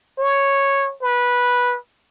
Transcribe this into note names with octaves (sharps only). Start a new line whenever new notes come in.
C#5
B4